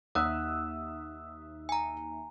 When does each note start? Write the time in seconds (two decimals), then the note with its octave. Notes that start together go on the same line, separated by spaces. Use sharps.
0.15 D#2 D#4 E5 F#5 D#6 E6 F#6
1.69 G#5 A#5